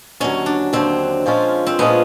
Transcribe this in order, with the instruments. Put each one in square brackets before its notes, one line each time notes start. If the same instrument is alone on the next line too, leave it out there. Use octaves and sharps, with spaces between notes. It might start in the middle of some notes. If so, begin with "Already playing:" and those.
[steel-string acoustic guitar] D#2 D3 F#3 [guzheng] C#4
[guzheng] D4
[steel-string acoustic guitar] D#2 D3 F#3 [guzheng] C4
[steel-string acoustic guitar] A#2 F3 G#3 C#4 F4
[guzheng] C4
[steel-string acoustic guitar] A#2 F3 G#3 C#4 F4 [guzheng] B3